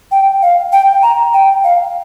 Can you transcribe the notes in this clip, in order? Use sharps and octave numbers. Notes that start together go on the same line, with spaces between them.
G5
F5
G5
A#5
G5
F5